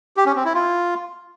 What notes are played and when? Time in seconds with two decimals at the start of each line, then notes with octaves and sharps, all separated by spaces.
0.17 G4
0.26 C#4
0.36 C4
0.45 E4
0.54 F4